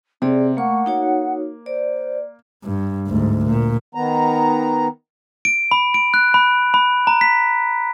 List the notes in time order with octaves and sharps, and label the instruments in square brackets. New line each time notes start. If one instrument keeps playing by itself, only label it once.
[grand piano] C3 [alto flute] C4 [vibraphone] G#4 D5
[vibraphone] A3 C#6 [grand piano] A#3 [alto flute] F#5
[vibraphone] D#4 F#4 C#5
[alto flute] C5 [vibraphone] D5
[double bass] G2
D2 G#2
A#2
[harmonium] D#3 B3 A#5
[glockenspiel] D7
B5
D7
F#6
B5
B5
A#5
B6